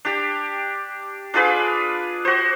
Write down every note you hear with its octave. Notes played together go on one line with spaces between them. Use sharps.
D4 G4
D4 F4 G#4 B4
F#4 C5